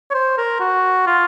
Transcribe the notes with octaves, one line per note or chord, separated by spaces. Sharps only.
C#5
C5
A#4
F#4
F4